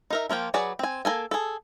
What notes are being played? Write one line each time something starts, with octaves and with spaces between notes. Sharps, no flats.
D#4 A#4 E5
F3 A#3 F4 G5
F#3 F#4 G#4 B4 D5
C4 G#5
A#3 G#4 A4 G#5
G#4 A4